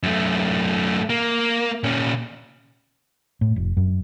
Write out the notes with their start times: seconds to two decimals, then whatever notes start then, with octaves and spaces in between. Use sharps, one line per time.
0.03 F#2 A3
1.10 A#3
1.84 A#2 C#4
3.41 A2
3.56 F1
3.77 F#2